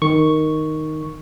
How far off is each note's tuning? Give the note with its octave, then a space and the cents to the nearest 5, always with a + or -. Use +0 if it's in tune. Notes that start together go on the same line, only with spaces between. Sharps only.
D#3 +0 C#6 +0